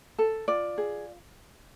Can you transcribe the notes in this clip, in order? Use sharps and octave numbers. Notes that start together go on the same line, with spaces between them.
A4
F4 D5
G#4